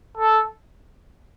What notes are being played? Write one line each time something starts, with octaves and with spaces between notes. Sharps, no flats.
A4